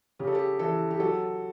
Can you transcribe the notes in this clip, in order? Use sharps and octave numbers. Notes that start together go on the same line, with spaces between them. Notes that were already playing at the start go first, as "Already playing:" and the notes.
C#3 G4
A4
G4
E3 A4
G4
F#3 A4